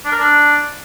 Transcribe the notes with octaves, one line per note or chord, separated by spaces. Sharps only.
D4
A#4
D4